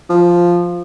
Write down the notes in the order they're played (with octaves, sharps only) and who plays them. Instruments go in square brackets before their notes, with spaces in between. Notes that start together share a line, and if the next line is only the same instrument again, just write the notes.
[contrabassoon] F3